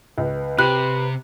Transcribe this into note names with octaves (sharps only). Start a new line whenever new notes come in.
C#2 B4
C3 G4 B5 F#6